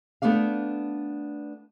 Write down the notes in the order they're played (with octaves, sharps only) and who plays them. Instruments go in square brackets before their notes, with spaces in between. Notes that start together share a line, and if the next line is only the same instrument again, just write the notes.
[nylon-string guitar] A3 B3 D4 D5 F5